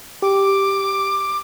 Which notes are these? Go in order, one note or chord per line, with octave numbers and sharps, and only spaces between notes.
G4 D6